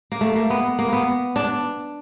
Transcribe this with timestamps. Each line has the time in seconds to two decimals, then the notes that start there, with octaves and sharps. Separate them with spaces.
0.12 A#3
0.21 A3
0.36 A#3
0.50 B3
0.79 A#3
0.93 B3
1.36 D4